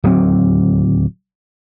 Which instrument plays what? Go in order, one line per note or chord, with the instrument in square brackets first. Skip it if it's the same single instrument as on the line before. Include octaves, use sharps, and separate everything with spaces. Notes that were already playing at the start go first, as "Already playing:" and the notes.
[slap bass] D1 D#2 F#3 C4